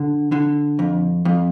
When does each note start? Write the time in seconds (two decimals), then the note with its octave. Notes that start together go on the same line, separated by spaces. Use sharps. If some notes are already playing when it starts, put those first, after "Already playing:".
Already playing: D3
0.32 D3
0.79 F2
1.25 F2